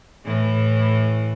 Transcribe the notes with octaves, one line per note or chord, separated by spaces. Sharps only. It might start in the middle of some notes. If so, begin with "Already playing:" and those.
A2 E3